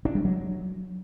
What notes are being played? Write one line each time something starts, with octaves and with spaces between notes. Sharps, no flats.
D4
G3
F#3